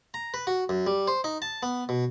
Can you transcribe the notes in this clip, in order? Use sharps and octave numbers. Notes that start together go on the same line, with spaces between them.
A#5
B4
F#4
F#2
G3
C5
D#4
A5
B3
B2